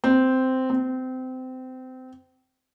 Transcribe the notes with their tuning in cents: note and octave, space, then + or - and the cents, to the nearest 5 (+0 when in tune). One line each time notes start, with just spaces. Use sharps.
C4 -10
C4 -25